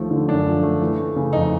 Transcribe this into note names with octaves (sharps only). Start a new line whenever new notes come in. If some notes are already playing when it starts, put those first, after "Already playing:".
Already playing: D#2 F3 A3
D3
F#2 D4
F3
A3
E3
A3
C#3
F2 D#4